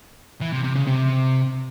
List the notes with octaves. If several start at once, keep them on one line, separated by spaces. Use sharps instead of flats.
E3
C3
C3
C#3
C3